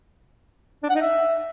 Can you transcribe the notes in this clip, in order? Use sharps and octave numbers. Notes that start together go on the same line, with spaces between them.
D4
F#5
D#4
E5